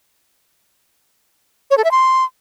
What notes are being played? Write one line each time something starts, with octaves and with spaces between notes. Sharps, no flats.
C#5
A4
E5
C6